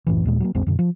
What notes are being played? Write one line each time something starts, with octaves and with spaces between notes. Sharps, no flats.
C2 F#2 A2 E3
D#2 A#2 G#3
F#3 G3 A#3
A1 E2 G#3 C4
F#2 B2 D3
F3